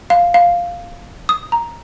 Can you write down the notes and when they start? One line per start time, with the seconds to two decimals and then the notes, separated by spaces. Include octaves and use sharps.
0.10 F5
0.34 F5
1.29 D#6
1.52 A#5